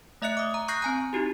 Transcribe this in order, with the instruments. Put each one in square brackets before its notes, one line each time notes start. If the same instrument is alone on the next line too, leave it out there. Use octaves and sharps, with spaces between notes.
[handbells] A3 D#5 E5 F#6 C#7
D6 D#6
A#5
C#6 D#6 F#6 G6 A#6 C7
C4 G#5 A#5
D#4 E4 F#4 G4